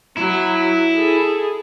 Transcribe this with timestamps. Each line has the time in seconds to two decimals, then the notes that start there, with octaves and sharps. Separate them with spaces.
0.17 F#3 E4
0.94 G#4 A4